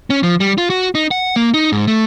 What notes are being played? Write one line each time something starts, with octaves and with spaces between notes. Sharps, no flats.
C#4
F3
G3
F4
F#4
D#4
F#5
A#3
D#4
G#2
A3